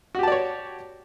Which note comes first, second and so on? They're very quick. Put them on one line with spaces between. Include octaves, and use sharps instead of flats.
F#4 G4 A5 D5 C#5